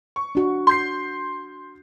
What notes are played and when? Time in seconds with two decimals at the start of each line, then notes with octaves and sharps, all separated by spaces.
0.16 C#6
0.35 D4 F#4
0.67 C6 G6 C7